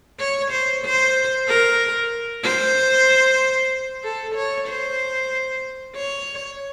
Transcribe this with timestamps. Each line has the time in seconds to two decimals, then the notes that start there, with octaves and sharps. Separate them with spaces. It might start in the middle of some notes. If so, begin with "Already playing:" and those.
0.19 C#5
0.51 C5
0.84 C5
1.47 A#4
2.43 C5
4.04 A4
4.35 C#5
4.68 C5
5.95 C#5